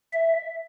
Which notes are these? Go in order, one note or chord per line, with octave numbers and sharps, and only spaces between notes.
E5